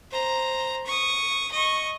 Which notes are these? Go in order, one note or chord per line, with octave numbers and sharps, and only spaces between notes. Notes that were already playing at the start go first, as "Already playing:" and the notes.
C5 A#5
C#6 D#6
D#5 C#6